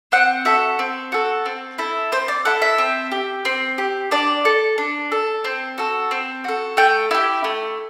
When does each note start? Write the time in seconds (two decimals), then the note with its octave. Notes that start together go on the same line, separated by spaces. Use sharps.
0.12 C4 F#5
0.45 F#4 A4 E5
0.79 C4
1.12 F#4 A4
1.46 C4
1.78 E4 A4
2.12 C4 C5
2.28 D5
2.45 E4 A4 F#5
2.62 E5
2.78 C4
3.12 G4
3.45 C4
3.78 G4
4.11 D4 D5
4.45 A4
4.78 D4
5.12 A4
5.44 C4
5.78 F#4 A4
6.11 C4
6.44 F#4 A4
6.77 A3 G5
7.11 E4 G4
7.44 A3